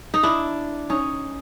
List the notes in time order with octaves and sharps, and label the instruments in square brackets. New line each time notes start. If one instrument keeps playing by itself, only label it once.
[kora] D#4
D4 E4
C#4 D#4